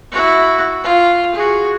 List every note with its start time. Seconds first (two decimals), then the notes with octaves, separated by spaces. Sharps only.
0.12 E4 F#4
0.84 F4
1.35 F#4 G#4